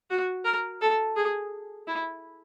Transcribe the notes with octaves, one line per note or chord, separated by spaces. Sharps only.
F#4
A#4
A4
G#4
E4